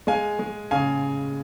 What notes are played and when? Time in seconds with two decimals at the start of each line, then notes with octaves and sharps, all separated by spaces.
0.07 G#3 F5 G#5
0.39 G#3
0.71 C#3 F5 G#5